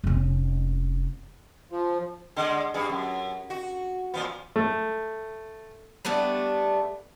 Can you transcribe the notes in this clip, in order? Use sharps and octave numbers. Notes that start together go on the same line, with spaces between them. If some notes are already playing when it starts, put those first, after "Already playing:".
F1 C#4
F3
D3 G#3
G2 G#4
F#2
F#4
A#2 F3 B3
A3
G3 A3 B3 D4